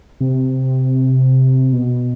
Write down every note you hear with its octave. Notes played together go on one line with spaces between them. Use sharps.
C3
B2